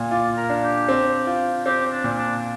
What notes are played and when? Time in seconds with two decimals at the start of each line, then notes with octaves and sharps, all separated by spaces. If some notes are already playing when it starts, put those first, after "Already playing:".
Already playing: A#2
0.11 F4 D5
0.37 A#4
0.49 D4
0.63 G4
0.88 C4
1.27 F4
1.66 C4 G4
1.92 D4
2.04 A#2
2.17 D4